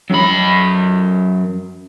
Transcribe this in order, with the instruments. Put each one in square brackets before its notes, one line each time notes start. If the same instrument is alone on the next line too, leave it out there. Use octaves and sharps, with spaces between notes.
[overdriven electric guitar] F#2 B5